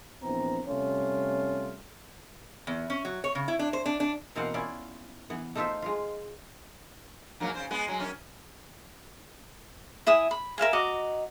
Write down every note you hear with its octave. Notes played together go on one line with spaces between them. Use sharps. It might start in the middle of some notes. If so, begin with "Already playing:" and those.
A#1 E3 B3 C4 A#5
C3 G3 A3 C#4 F4
E2
C#4
F#3
C#5
C#3
E4
D4
C5
D4
D4
B2 E3 A#3 C4 F5 F#5
B3 C#4 E4 F4 D5
E3 B3
A3 D#4 F4 A4 C5 E5
G#3 F4
G#2 F#3 A#3
C#3 C5
G#3 B3
F#3 G#3
F#2 D#3 C#4
E4 E5 G#5 D#6
B5
A#4 E5 F5 G#5
F#4 D#5 A#5 D6